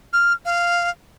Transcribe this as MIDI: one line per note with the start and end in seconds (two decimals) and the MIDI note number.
0.13 0.33 89
0.45 0.90 77